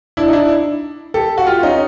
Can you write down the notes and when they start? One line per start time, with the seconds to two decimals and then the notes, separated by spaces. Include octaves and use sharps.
0.17 D4 E4
0.28 D#4
0.33 D4 E4
1.14 G4 A4
1.38 F#4
1.47 F4 G4
1.63 C#4 D#4